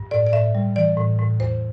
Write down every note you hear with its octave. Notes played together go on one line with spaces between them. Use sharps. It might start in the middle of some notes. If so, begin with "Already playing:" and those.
Already playing: G2
A2 D5
D5
A2 E5
G3
E3 D5
A2
A2
E2 C5